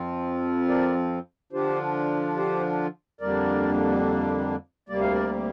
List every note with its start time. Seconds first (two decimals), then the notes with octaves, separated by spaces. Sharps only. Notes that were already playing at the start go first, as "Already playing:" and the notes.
Already playing: F2 F3 C4 F4
0.69 A#4 D5
1.52 D3 F3 D4 F4 G4 C5
2.37 G4 C5
3.21 F2 D3 G3 A#3 D4 A#4 D5
4.89 D2 C3 G3 A#3 D5
5.01 F5
5.12 A#4 D5